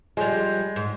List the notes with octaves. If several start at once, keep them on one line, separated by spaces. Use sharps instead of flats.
F3 G3 G#3
G#2